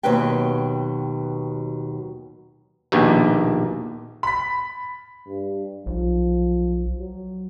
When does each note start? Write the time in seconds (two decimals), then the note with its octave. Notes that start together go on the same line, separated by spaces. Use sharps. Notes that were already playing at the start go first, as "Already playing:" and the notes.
0.03 D#2 B2 F#3 C4 B4 G5
2.92 A#1 D#2 B2
4.23 B5 B6
5.28 G2
5.86 B1 F3
6.99 F#3